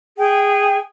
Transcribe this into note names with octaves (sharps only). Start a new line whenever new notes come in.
G#4 G5